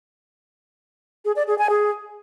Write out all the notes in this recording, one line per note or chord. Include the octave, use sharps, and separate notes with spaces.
G#4
D5
G#4
G#5
G#4